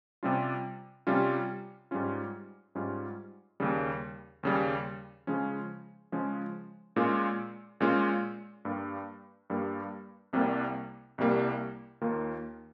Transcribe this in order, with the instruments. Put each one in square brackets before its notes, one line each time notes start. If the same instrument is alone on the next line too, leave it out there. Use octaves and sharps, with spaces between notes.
[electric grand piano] C3 G3 C#4 F4
C3 G3 C#4 F4
G#2 G3 C#4 F4
G#2 G3 C#4 F4
D#2 C#3 G3
D#2 C#3 G3
C#3 F3 G#3 C#4
C#3 F3 G#3 C#4
A#2 G#3 C#4 F4
A#2 G#3 C#4 F4
G2 G3 A#3
G2 G3 A#3
C2 C3 G3 A#3
C2 C3 G3 A#3
D#2 D#3 A#3 F4